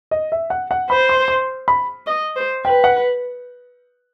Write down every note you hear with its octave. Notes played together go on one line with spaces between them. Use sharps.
D#5
E5
F#5
F#5
C5 B5
C6
C6
B5
D#5
C5
B4 G5
F#5